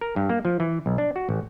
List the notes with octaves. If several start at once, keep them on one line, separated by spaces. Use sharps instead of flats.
A#4
G2
A#3
F3
E3
B1
D4
F#4
A1